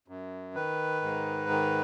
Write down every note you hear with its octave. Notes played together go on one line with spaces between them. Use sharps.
F#2
D#3 B4
G#2
D#3